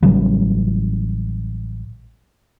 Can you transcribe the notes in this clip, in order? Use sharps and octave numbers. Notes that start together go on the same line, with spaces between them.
A1 C#3 F#3 G3